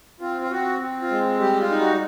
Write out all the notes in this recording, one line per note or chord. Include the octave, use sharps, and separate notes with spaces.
C4 F4
F4
C4 F#4
C4
F4
G#3
G3 G4
F4
D#4
F#4